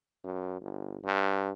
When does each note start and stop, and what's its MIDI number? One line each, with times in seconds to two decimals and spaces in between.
0.24 0.60 42
0.61 0.97 31
1.04 1.51 43